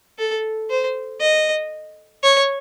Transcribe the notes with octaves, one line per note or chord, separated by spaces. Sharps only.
A4
C5
D#5
C#5